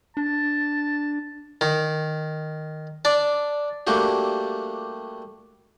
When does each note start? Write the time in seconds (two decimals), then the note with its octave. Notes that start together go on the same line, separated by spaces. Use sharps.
0.17 D4 A5
1.61 D#3
3.05 D4
3.87 G3 A3 A#3 D4 F#4 G4